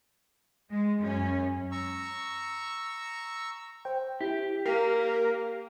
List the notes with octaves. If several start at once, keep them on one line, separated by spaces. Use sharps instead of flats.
G#3
F#2 C#4
A#5 C#6 E6
C5 G5
E4 G4
A#3 A#4 C7